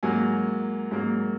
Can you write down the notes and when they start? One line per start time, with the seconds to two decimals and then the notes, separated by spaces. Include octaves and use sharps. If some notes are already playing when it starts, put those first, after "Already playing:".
0.03 G#2 F#3 A#3 G#5
0.91 G#2 F#3 A#3